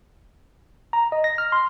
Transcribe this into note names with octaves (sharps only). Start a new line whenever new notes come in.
A#5
D#5
A#6
F6
C6